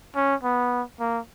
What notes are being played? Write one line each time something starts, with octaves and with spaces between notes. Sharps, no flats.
C#4
B3
A#3